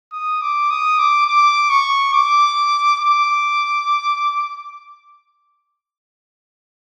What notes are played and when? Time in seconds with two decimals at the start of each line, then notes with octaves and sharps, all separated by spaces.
0.12 D#6
0.41 D6
0.70 D#6
0.98 D6
1.27 D6
1.70 C#6
2.14 D6
2.99 D6